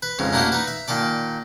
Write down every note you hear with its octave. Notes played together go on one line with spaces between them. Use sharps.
B4
F2 G#2 C#3
A3 A#3 D4 E4 F#4 G4
D#4 B4
E5
A#2 D#3 A4 D5